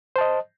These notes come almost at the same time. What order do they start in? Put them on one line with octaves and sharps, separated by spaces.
C5 A5 D#5